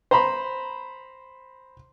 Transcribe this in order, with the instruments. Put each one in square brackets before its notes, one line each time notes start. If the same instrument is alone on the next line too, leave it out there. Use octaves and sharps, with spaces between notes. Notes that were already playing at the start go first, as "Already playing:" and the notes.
[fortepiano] C5 A#5 B5